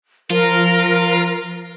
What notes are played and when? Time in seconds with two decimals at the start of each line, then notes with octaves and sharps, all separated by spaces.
0.30 F3 F4 A#4